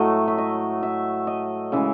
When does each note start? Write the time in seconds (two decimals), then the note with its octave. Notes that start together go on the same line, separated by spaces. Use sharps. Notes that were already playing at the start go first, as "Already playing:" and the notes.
Already playing: A2 F#3 A3 D#5
0.27 E5
0.38 D#5
0.83 E5
1.27 D#5
1.72 C#3 E3 G#3 E5